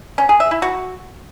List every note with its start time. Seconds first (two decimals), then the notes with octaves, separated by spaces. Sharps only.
0.18 C#4
0.29 G#4
0.40 E5
0.51 E4
0.62 F#4